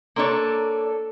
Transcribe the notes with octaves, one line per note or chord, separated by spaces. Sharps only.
A#3 D4 A4 B4 C#5 D5 C6